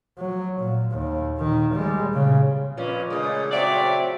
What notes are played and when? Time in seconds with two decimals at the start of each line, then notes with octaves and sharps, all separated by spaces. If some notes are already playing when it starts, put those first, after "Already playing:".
0.18 F#3
0.59 A#2
0.91 D#2
1.38 A#2 D#3
1.74 G3 G#3
2.13 A#2 C#3
2.77 F2 A#2 C#4 F4 B4
3.10 A#2 C#3 G#3 A3 D#6
3.52 F#3 C4 D5 E5